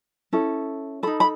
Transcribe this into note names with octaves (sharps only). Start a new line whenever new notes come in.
C#4 E4 A4
D#4 A4 B5
B5